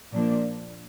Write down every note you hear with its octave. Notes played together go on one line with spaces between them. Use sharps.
A#2 F3 A#3 D4